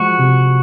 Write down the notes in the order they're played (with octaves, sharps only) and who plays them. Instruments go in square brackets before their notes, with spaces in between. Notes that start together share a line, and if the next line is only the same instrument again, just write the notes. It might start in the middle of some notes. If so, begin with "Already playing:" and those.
Already playing: [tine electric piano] F3 G#3 [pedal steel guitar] F#4
[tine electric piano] C3